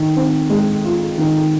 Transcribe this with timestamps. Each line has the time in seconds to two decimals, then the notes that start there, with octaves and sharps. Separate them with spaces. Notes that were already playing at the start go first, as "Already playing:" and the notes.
Already playing: D#3
0.16 C4
0.50 G#3
0.85 F4
1.18 D#3